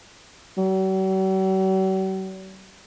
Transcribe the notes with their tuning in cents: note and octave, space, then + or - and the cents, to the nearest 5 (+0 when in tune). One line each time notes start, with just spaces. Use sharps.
F#3 +45